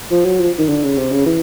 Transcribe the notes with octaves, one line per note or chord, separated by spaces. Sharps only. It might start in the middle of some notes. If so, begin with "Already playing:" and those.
F3
F#3
F3
D#3
D3
C#3
C3
C#3
E3